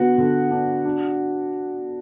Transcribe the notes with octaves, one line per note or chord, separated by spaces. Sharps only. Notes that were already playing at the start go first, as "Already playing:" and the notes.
Already playing: D3 B3 F#4 F#5
D3
D4
D4